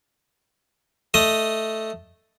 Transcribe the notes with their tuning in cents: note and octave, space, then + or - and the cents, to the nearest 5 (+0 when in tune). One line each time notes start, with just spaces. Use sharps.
A3 +0 D#5 +0